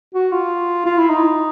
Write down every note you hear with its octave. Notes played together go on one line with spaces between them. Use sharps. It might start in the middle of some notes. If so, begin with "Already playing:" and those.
F#4
F4
F4
E4
D#4